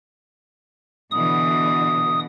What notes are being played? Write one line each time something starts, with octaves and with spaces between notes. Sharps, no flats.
B2 D3 E3 D#6